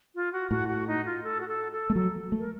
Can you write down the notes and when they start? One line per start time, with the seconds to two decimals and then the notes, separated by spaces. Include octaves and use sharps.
0.15 F4
0.33 F#4
0.51 A2 F#4
0.68 F#4
0.88 D#4
1.06 F4
1.24 A4
1.41 F#4
1.48 A4
1.72 A4
1.90 A3
1.96 F#3 A4
2.32 A3
2.39 A#4